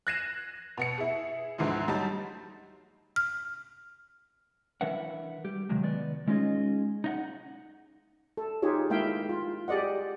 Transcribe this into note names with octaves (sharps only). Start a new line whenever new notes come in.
F#6 G#6 A#6 C7 D#7 E7
B2 B3 C#7
E4 G#4
D2 G#2 D3 E3 F3 G#3
F#3 G3 D#4 A5 A6
F6
E3 D4 A#4 B4 E5 F#5
G3 G4
C3 D#3 F3 F#3 G#3
D#3 B3 D5
G#3 C#4 D#4 F4 G#4 D#5
D#4 D#5 F#5
A4
D#4 F4 G4 G#4 C#5
G#3 A#3 E4 E5 F5 G5
F4
G4 G#4 D5 D#5 F#5